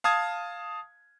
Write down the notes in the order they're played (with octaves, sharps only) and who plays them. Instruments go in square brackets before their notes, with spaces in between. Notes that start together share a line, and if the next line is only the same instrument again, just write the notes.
[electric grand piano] F5 A5 D#6 G#6